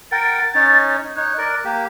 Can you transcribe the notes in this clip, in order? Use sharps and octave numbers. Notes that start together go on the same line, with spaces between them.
A#4 F#5 G5 A6
C#4 D#4 C#5
D#4 C#5 F#6
A#4 D5
A#3 G4